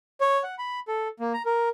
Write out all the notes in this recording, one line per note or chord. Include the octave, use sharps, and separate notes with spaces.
C#5
F#5
B5
A4
A#3
A#5
A#4